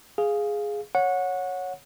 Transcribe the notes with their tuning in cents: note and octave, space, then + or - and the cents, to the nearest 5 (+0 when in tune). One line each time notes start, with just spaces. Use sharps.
G#4 +0 F5 +0
C#5 +0 F#5 -20